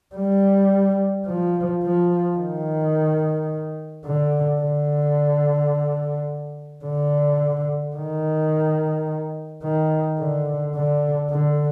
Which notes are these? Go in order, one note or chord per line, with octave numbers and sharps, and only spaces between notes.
G3
F3
F3
D#3
D3
D3
D3
D#3
D#3
D3
D3
D3